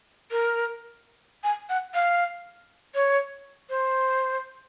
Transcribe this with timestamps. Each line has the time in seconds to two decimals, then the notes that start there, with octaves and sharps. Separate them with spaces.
0.31 A#4
1.44 G#5
1.69 F#5
1.94 F5
2.95 C#5
3.69 C5